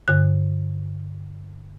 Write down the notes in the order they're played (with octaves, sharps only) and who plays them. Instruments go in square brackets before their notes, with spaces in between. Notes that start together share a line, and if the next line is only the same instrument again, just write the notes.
[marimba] G2 D3 F#6